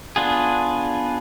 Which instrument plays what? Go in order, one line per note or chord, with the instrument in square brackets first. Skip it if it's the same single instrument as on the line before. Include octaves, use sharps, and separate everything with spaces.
[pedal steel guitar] B3 D4 F4 G#4